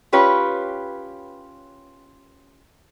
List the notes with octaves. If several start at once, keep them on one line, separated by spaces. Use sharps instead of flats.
C#4 F4 G4 B4 C#5